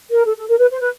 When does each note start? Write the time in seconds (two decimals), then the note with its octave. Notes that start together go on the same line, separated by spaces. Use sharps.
0.10 A#4
0.26 A4
0.37 A4
0.48 A#4
0.58 B4
0.70 C5
0.80 B4